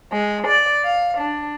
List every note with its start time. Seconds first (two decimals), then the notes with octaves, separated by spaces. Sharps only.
0.12 G#3
0.46 D5
0.84 F5
1.17 D4